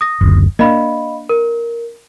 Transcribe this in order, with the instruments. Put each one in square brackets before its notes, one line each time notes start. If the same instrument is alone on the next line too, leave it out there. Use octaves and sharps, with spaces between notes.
[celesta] D#6 A#6
[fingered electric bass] F#1 D2
[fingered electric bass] A#3 C#4 D4 [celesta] D#5 F5 B5
[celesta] A#4